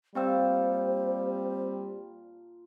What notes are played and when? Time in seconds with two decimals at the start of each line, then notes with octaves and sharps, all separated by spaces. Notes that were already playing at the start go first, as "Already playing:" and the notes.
0.15 A#2 G3 C4 F4 C5 G5 A5 E6